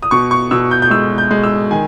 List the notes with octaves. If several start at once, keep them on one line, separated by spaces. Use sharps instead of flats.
D#6
B2 C#6
C#6
B2 E6
G6
G6
G#3 E6
G6
G#3
E6
D#3 G#5